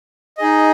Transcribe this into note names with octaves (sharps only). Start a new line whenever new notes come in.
D#4 G#4 D#5